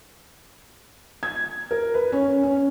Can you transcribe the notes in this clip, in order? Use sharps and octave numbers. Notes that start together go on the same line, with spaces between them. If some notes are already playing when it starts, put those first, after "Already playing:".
G#6
A#4
B4
C#4
C#4